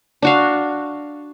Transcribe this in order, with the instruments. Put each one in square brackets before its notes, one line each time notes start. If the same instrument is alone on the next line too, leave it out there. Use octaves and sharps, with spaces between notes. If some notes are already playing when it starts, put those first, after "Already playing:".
[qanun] D4 F#4 F5